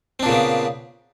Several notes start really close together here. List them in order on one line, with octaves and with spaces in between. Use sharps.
C4 D4 A#2 C#3 B3